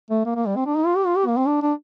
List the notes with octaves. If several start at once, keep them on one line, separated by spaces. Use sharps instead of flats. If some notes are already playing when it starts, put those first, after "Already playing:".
A3
A#3
A#3
G3
C4
D4
D#4
F4
G4
F4
G4
A#3
C4
D4
D4